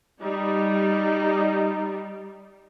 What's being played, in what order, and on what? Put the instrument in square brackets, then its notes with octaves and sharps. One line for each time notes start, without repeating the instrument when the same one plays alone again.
[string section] G3 [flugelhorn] D#4